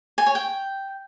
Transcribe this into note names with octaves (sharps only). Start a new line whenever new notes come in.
G#5
C#5
G5